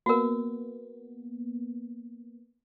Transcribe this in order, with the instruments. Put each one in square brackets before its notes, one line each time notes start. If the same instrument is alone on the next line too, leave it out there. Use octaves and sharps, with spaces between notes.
[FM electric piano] A#3 B3 [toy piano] F#4 A#4